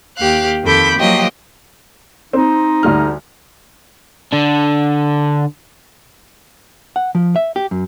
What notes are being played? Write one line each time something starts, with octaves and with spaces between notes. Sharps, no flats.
D#2 G4 F5 F#6
F2 D#3 A4 B5 D6 G6
F3 F#3 A#3 G4 D#5
C4 D#4
D2 G3 F6
D3 D4
F#5
F3
E5
G4
F#2